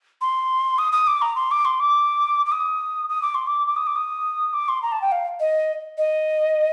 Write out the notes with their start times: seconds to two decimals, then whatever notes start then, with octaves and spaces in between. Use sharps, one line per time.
0.21 C6
0.78 D#6
0.92 D#6
1.07 D6
1.21 A#5
1.35 C6
1.51 D6
1.65 C6
1.80 D6
2.46 D6
2.52 D#6
3.09 D#6
3.22 D6
3.35 C6
3.47 D6
3.67 D6
3.76 D#6
3.87 D6
3.95 D#6
4.53 D6
4.68 C6
4.82 A#5
4.92 A5
5.01 G5
5.12 F5
5.40 D#5
5.98 D#5